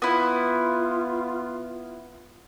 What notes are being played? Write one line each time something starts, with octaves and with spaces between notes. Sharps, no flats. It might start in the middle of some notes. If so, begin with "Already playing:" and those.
B3 E4 F4